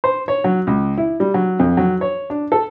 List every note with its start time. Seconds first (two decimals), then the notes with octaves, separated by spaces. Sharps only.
0.04 C5
0.28 C#5
0.44 F#3
0.67 C#2
0.98 E4
1.20 G3
1.34 F#3
1.59 F2
1.77 F#3
2.01 C#5
2.30 D4
2.52 A4